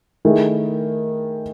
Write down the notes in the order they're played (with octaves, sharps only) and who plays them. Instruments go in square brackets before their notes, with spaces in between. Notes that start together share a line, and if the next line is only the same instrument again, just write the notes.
[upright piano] D#3 A3 E4 G#4